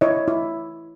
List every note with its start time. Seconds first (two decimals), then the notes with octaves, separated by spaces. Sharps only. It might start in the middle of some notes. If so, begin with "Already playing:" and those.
0.01 E4 C#5 D#5
0.28 E4